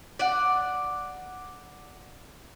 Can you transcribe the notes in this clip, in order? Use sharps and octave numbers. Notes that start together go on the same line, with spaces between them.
D5 F#5